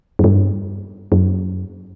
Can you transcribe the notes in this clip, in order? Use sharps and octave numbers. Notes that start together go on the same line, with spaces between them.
F#2
G2
F#2